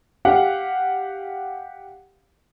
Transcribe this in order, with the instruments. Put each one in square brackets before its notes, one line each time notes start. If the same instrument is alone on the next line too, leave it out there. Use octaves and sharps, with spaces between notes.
[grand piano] G4 F5 F#5